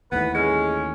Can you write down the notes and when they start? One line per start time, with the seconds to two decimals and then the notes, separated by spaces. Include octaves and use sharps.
0.12 D#2 A2 E3 B3 B4
0.34 G#3 C#4